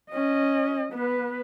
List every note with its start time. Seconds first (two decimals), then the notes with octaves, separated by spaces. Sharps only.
0.11 C#4 D#5
0.93 B3 B4